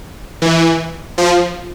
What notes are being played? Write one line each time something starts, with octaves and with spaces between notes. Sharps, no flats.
E3
F3